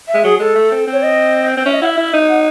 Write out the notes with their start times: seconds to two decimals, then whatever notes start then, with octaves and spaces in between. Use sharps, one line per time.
0.08 E5
0.14 G#3
0.24 F#3 G#4
0.39 G#3 A4
0.55 A3
0.72 C4
0.87 C4
0.93 C#5
1.03 D#5
1.57 C4
1.66 C#4 E5
1.74 D#5
1.82 E4 F#5
1.86 E5
1.97 E4
2.13 D#4
2.29 F#5